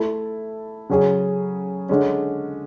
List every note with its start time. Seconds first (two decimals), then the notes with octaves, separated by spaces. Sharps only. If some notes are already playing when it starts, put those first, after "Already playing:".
Already playing: A3 E4 A4
0.89 C#3 F#3 C#4 G#4
1.89 D3 G#3 C#4